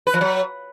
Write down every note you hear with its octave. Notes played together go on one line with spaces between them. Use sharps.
B4
F3
F#3